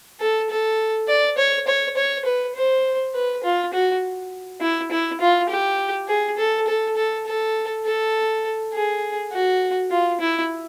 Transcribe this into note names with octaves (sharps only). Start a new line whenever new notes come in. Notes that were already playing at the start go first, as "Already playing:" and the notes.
A4
A4
D5
C#5
C#5
C#5
B4
C5
B4
F4
F#4
E4
E4
F4
G4
G#4
A4
A4
A4
A4
A4
G#4
F#4
F4
E4